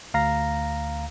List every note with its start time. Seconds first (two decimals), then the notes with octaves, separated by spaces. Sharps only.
0.14 D2 F5 A#5 A#6